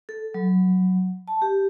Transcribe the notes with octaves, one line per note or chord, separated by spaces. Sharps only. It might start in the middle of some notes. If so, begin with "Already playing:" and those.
A4
F#3
A5
G4